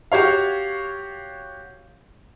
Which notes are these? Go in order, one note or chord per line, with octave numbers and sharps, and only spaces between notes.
F#4 G4 C#5 F5